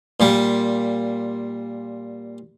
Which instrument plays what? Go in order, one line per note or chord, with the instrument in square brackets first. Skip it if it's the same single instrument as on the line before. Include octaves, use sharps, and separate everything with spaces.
[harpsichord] A#2 G3